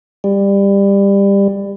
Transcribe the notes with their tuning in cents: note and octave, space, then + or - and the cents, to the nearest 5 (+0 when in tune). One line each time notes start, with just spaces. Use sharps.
G3 +20